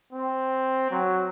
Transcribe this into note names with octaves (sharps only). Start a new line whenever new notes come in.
C4
F#3